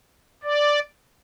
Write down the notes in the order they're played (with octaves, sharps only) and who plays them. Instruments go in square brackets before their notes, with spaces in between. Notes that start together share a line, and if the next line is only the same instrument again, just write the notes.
[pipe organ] D5